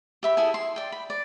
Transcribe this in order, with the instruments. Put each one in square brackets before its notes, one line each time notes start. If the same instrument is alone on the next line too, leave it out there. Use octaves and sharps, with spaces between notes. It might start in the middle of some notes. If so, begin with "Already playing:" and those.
[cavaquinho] G4 E5 B5
E4 G#4 A4 G#5
C6
D5 G5
B5
D5